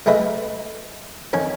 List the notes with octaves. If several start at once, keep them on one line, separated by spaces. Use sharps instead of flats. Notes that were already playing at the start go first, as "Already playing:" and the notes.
C2 A3 G#4 B4 D#5 E5
F2 D#3 C#4 G#5